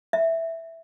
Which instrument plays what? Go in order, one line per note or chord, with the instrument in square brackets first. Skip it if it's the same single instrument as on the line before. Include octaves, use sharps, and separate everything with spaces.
[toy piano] E5